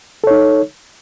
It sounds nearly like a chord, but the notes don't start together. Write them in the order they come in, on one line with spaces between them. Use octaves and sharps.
A4 C#5 D#4